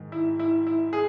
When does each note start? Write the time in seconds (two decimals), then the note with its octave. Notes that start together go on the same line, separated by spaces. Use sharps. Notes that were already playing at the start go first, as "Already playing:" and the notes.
Already playing: G#2 D#3 G#3
0.12 E4
0.39 E4
0.67 E4
0.93 G#4